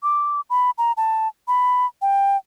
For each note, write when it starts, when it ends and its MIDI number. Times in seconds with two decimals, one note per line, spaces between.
0.03 0.41 86
0.50 0.71 83
0.78 0.92 82
0.97 1.28 81
1.48 1.86 83
2.02 2.37 79